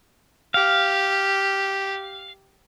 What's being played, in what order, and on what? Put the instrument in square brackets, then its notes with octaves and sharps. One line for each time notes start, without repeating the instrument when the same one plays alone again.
[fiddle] G4 [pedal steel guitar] F5